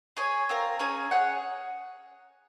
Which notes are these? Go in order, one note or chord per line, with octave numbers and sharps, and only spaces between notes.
G#4 C#5 G#5
C4 F4 A#4
C#4 G#4 C#5 G#5
G#4 C#5 F#5